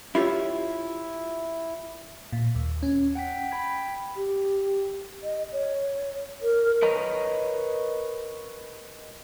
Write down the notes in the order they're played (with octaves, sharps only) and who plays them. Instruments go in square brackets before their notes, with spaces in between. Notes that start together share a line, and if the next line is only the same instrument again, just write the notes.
[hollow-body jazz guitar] E4 F4 G4 C#5
[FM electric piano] A#2
D#2
C#4
[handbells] F#5 G5 B6
G5 B5 G#6 B6
[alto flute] G4
D#5
C#5
A#4
[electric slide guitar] A#4 B4 C#5 D#5 A#5